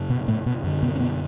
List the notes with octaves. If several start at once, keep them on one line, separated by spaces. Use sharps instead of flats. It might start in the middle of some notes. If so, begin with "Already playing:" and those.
Already playing: F#2 C#3
B2 B3
A2 A3
B2 B3
F#2 D3
B2 B3
C#4
B2 B3